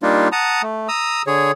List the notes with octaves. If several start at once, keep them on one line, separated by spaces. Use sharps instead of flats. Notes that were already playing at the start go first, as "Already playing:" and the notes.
G3 A#3 D4 D#4 F4
F#5 A5 A#5 D#6
A3
A#5 D#6 E6
D3 G#4 C#5